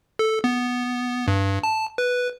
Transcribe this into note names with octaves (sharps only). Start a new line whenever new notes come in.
A4
B3
G2
A5
B4